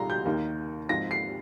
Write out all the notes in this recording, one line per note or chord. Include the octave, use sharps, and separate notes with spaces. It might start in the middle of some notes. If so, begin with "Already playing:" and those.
Already playing: C2 A#2 G#3 D#4 A#5 C6
G6
D#2 D#3 A#3 D#4
G#2 F3 C4 D#4 A#6
C7